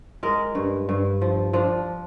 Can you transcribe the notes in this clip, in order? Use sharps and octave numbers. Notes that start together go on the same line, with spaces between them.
G#3 A#4
G2
G2
F3
F3 D4